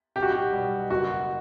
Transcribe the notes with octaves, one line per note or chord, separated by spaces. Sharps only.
B1 G4
F#4
G4
B2 G3
F#1 F#4